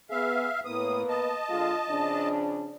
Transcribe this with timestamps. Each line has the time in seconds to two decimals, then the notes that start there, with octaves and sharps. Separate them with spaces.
0.10 B3 G#4 E5 F5
0.65 A2 A#3 B3 B4 D#6
1.09 D#5 A5
1.48 D3 G#3 F4
1.88 C#3 F3 D4